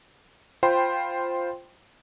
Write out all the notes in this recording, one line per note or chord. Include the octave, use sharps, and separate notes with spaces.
F4 C5 G5 B5 C6